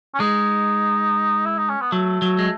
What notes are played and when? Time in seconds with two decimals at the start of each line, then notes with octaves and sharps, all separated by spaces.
0.15 C#4
0.20 G#3 D#4
1.46 E4
1.58 D#4
1.69 C#4
1.81 B3
1.92 F#3 A3
2.22 F#3
2.39 G#3